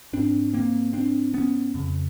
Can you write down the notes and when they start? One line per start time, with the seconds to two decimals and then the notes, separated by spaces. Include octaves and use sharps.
0.13 G#2 C4 D4
0.54 A#3 C4
0.93 C4 D4
1.34 B3 C#4
1.74 F2 C#3